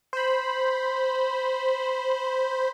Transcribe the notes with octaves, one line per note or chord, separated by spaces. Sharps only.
C5 B5